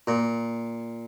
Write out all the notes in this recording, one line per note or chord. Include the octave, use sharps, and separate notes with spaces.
A#2